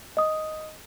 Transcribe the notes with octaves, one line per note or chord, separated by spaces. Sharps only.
D#5 D#6